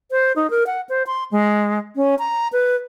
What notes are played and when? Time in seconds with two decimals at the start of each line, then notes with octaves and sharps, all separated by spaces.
0.11 C5
0.36 D#4
0.50 A#4
0.67 F#5
0.89 C5
1.07 C6
1.31 G#3
1.96 C#4
2.19 A#5
2.53 B4